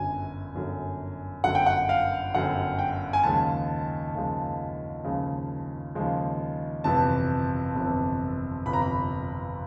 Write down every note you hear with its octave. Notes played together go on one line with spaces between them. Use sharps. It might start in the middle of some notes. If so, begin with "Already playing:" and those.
Already playing: G1 F#2 D3 F#3 G#5
G1 F#2 D3 F#3
G1 F#2 D3 F#3 F#5
G5
F#5
F5
G1 F#2 D3 F#3 F#5
G5
G#5
D#2 C#3 F3 G#3 A5
D#2 C#3 F3 G#3
D#2 C#3 F3 G#3
D#2 C#3 F3 G#3
G1 F2 C3 E3 A5
G1 F2 C3 E3
G1 F2 C3 E3 B5
A#5
B5